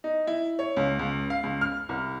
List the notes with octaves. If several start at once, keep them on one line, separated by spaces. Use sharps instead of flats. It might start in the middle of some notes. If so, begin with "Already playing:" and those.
D#4
E4
C#5
C#2
C#2
F5
C#2
F6
C2